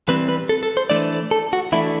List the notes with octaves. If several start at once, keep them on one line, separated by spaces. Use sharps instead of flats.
E3 G3 C4 B4
B4
A4
A4
C5
E3 A3 D4 D5
A4
F#4
E3 A3 D4 E4